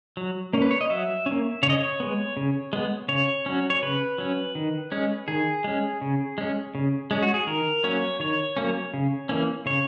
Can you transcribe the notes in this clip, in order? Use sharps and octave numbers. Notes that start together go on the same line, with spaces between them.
F#3
A#3 C#4
B4
C#5
D#5
F#3 E5
C#4
A#3
C#3 C#5
D#5
C#5
G#3 B3
C#3
G#3 B3
C#3 C#5
F#3 C#4
C#5
C#3 B4
F#3 C#4
D#3
G#3 C#4
D#3 G#4
G#3 C#4
C#3
G#3 C#4
C#3
G#3 C#4
F#4
G#4
D#3 A#4
F#3 A#3 C#4 C#5
D#3 C#5
F#3 A#3 C#4
C#3
E3 A#3 C#4
C#3 C#5